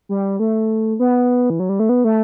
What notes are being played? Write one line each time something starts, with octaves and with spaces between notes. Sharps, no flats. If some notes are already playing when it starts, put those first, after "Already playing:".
G3
A3
B3
E3
F#3
G3
A3
B3
A3